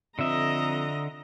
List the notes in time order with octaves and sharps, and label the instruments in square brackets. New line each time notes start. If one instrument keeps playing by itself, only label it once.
[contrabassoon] F2 [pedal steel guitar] D3 E5 [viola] D#5 A#5